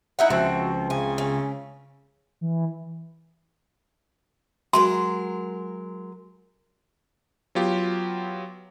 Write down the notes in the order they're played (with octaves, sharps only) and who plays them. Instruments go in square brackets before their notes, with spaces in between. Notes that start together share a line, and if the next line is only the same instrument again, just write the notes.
[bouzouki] D#4 E4 F#5
[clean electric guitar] C#2 C4 [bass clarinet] F3 [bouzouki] F#4
[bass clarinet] C#3 [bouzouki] G#5
[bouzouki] C#4
[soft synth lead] E3
[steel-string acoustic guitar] F#3 G#3 A#4 [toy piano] C6
[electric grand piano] F#3 B3 F4 G4